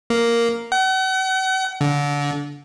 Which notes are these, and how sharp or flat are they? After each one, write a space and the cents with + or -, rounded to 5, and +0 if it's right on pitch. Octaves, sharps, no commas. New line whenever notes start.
A#3 +0
F#5 +40
D3 -25